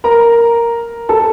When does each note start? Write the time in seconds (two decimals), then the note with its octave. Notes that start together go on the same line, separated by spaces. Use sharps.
0.04 A#4 A#5
1.09 A4 A5